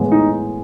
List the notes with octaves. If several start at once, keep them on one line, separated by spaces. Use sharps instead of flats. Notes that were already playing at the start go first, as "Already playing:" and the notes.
Already playing: A2 E3 G#3 B3
D#4